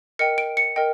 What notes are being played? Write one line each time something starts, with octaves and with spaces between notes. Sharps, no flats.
A#4 D#5 G5 C#7
D7
C#7
A#4 D#5 G5